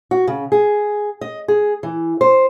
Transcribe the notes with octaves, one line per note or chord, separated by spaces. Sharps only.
F#4
C#3
G#4
D#5
G#4
E3
C5